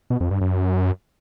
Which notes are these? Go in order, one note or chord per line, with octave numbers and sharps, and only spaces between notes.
B2
F2
G2
F#2